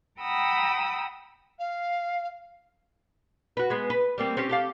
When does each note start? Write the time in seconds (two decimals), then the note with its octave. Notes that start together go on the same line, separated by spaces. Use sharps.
0.20 F#5 G5 A#5 B5 D#6 E6
1.58 F5
3.57 F#4 B4
3.70 G#3 B3
3.90 B4
4.18 G3 A#3 C4
4.37 C4 C#4 G4
4.49 G4 A4 F5